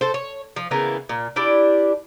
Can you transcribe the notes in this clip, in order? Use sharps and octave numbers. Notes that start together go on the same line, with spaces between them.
A4 C5
C#5
F3
C#3 E3 A#3 B3
A#2
D4 E4 G4 D5